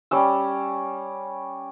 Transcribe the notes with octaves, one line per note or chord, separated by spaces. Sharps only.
G3 C#4 E6